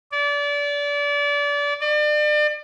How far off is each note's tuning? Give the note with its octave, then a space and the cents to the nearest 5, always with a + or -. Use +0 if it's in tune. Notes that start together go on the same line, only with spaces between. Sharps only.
D5 -30
D5 +35